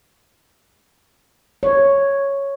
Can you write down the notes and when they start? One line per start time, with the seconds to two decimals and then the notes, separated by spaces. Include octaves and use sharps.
1.63 C#5